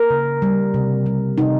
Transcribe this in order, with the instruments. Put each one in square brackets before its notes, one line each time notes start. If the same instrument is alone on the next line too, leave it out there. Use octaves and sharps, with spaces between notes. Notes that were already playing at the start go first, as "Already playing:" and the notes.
Already playing: [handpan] A#4
C#3
G3
C3
G3
C3 D#4